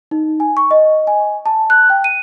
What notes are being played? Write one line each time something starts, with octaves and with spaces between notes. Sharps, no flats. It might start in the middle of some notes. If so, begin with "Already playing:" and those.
D#4
G#5
C#6
D#5
G#5
A5
F#6
G5
D#7